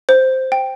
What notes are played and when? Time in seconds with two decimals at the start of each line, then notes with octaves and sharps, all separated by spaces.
0.09 C5
0.52 G5